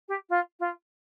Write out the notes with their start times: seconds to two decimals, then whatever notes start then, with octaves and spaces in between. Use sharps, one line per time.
0.08 G4
0.30 F4
0.60 F4